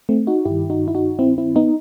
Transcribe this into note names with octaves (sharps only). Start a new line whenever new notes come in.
A3 C4
D#4 F#4
G2 D#3 E4 G4
D#4 F#4
E4
D#4 F#4
C4 E4
C4 E4
B3 D#4